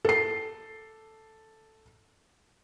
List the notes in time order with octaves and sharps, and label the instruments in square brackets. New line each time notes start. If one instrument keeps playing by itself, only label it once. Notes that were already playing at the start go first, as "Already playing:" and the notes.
[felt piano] A4 C7